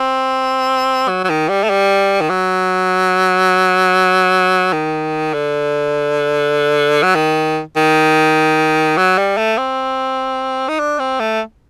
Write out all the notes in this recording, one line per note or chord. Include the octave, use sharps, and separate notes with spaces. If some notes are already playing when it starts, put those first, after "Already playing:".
Already playing: C4
F#3
F#3
D#3
G3
A3
G3
D#3
F#3
D#3
D3
F#3
D#3
D#3
F#3
G3
A3
C4
D#4
D4
C4
A3